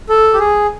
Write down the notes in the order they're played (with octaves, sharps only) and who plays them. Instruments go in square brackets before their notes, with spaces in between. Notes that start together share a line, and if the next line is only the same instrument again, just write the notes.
[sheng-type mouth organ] A4
G4
G#4